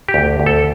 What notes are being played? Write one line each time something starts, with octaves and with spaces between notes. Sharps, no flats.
G4
D2
D2
A4